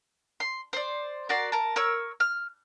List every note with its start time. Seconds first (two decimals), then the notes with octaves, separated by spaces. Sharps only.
0.40 C6
0.73 C5 D5
1.29 F#4 A#4 D5 C6
1.52 A#4 A5
1.76 A#4 C#5 E6
2.20 F6